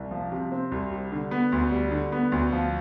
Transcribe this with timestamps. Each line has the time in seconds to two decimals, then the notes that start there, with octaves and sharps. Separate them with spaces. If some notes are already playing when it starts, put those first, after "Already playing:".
Already playing: C2
0.11 F3
0.32 C3
0.52 C4
0.72 C2
0.91 G3
1.12 D3
1.31 B3
1.52 D2
1.72 G3
1.91 D3
2.12 B3
2.32 D2
2.52 F3